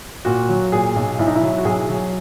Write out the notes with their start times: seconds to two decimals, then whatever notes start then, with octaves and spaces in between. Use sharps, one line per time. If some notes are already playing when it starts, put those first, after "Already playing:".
0.25 A#2 F#4
0.49 F#3
0.72 A#2 G#4
0.96 B1
1.19 B1 E4
1.27 D#4
1.35 E4
1.42 F#3
1.58 F#4
1.65 B1 G#4
1.89 F#3